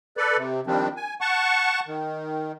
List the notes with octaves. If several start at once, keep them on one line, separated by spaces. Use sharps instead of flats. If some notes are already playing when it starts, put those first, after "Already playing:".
A4 B4 D5
C3
D#3 F3 G3 C4 D4
G#5
F#5 A5 C#6
D#3